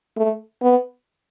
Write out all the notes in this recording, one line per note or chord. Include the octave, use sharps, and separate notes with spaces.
A3
B3